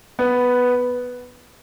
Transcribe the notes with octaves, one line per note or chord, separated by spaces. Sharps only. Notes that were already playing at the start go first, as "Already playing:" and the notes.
B3 B4